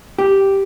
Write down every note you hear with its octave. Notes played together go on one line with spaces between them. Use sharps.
G4